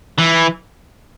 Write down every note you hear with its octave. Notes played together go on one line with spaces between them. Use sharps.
E3